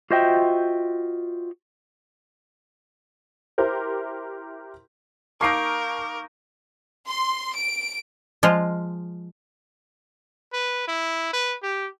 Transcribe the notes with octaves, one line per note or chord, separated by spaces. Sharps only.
F4 F#4 C5 D#5 E5 G5
E4 G4 A#4 C5
A#3 D#4 A#4 A5 C#6 D6 C7 D7
C6
D7
F3 G#3 F4
B4
E4
B4
G4